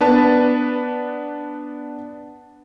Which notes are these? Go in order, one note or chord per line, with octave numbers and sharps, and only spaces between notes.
B3 D4 B4 A5